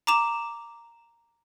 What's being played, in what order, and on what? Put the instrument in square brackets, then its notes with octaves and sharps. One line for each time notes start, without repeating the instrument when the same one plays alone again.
[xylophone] A#5 D6 E7 F7